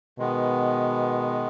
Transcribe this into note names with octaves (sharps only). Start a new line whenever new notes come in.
B2 D#3 G#3 B3